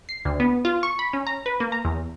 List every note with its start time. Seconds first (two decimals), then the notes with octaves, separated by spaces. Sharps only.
0.09 C7
0.25 D2
0.40 B3
0.65 F4
0.83 C#6
0.99 B5
1.13 C#4
1.27 A#5
1.46 B4
1.60 A#3
1.72 A#5
1.85 E2